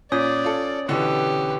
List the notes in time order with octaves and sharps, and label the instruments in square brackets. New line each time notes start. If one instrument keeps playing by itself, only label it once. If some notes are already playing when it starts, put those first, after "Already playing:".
[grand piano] A#2 [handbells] C#4 C#5 D#6 [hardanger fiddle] D5
[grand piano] F4 A4
[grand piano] B2 D3 E3 [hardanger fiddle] G4 B4